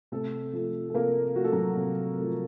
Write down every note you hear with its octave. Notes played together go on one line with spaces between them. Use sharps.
C3 A3 A4
F3 A3
A4
C3 A#3 A#4
F3 A3 F#4
A4
F#3 F#4
C3
F3 A3